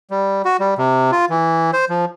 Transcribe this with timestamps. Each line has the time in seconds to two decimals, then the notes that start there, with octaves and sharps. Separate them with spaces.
0.10 G3
0.45 F#4
0.60 G3
0.78 C3
1.12 F4
1.30 E3
1.73 C5
1.89 F3